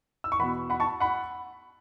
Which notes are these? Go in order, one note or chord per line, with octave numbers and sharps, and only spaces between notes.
E6
C#6
E2 B2 B3 F#5 B5
F#5 B5
A5 C#6
F#5 B5